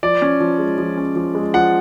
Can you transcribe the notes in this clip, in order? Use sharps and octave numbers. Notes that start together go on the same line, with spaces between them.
F3 D5
C#4
F3
G#3
F3
C#4
F3
G#3
F3 F#5